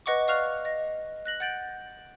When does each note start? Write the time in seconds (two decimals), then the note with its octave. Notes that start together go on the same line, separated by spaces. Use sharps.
0.06 B4 D#5 F#5 C#6 D6
0.28 D5 F5 C#6 F6 F#6 F7
0.65 D#5 A#6
1.26 F#6 A#6 F#7
1.40 F#5 G6 A6 D7 F#7